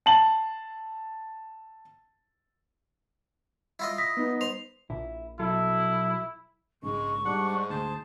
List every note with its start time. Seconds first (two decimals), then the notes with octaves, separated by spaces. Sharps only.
0.06 A5 F#7
3.79 E4 F4 D#5
3.98 D#6 A#6 B6
4.17 B3 D#4
4.41 C5 F7
4.90 A#1 E4
5.39 B1 F#3 E4 A4
6.83 A#1 G#2 C#3 G#3 C#6
7.25 G#2 G3 D4 F#5
7.70 D2 G#4 C5 A5